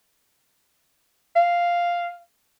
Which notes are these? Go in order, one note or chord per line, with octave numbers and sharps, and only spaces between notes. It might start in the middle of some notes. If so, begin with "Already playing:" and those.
F5